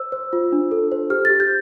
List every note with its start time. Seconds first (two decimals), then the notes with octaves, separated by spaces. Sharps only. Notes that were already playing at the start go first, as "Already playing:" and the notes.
Already playing: C5 E6
0.12 C5
0.33 F4
0.52 D4
0.71 A4
0.92 C5
1.10 G4 F6
1.25 A6
1.30 G4
1.40 G6